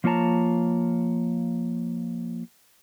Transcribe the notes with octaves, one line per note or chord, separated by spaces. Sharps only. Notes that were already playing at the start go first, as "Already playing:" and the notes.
F3 A#3 F4 C#5 A5 A#5